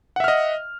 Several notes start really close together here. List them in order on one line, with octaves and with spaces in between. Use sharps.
F#5 E5 F6 D#5